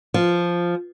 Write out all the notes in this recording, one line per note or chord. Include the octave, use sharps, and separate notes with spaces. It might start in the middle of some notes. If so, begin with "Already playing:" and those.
F3